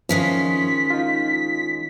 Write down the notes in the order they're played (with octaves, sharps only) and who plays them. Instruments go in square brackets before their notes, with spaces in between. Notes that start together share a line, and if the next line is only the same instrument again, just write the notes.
[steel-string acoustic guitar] D#3 G#3 C#4 [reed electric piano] F3 [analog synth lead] B6
[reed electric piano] D#4 F4